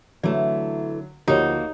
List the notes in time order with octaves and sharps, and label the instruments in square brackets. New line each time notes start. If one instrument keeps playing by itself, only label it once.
[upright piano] D3 F#3 [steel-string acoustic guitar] E3 A3 [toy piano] D5
[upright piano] D2 F3 [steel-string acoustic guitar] A#3 F#4 [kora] D#4 [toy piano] G4 C#5